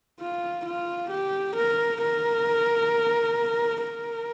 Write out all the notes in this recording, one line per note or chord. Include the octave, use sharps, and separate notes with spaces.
F4
F4
G4
A#4
A#4
A#4